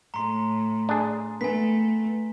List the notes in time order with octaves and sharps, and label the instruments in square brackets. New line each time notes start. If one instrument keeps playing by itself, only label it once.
[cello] A2 [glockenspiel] A#5 C6
[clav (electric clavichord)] D4 G#4
[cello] A3 [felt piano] B3 [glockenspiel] G#5 B6